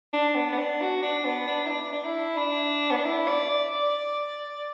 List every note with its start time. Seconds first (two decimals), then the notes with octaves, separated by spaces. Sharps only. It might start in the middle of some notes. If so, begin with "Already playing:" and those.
0.13 D4
0.35 B3
0.53 B3
0.58 D4
0.81 F#4
1.02 D4
1.25 B3
1.47 D4
1.66 E4
1.70 D4
1.92 D4
2.04 E4
2.37 D4
2.91 B3
2.97 D4
3.04 E4
3.28 D5
3.50 D5